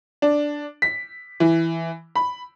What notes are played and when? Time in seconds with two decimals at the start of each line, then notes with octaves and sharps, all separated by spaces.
0.22 D4
0.82 B6
1.40 E3
2.16 B5